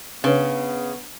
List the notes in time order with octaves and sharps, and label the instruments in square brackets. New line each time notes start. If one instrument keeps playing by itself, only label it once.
[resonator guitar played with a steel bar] C#3 [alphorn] B3 [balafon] D4 B4 C#5